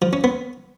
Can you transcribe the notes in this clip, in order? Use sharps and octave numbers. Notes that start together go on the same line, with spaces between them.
F3
C#4
B3